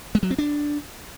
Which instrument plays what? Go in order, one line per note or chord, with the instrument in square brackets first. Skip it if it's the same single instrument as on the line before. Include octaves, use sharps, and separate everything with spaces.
[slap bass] G#3
F#3
C4
D4